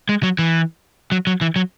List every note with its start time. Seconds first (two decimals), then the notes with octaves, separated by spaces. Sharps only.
0.09 G#3
0.23 F#3
0.39 E3
1.12 F#3
1.27 F#3
1.41 E3
1.56 F#3